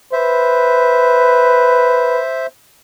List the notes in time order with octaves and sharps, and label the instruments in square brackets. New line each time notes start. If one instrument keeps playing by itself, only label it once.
[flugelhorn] B4 [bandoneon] C5 E5